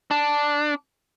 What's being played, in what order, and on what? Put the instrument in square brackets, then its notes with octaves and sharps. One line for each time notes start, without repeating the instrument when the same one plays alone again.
[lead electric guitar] D4